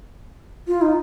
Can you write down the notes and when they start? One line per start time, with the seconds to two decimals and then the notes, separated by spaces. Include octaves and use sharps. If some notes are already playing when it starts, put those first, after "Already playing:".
0.67 F4
0.82 D#4